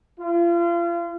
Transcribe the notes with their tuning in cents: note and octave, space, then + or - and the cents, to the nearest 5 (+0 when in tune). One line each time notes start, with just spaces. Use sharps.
F4 -35